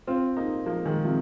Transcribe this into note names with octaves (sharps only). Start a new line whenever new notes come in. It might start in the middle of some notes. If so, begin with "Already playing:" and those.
C4 F4
A#3 D#4
F3 A#3
D#3 G#3
C3 F3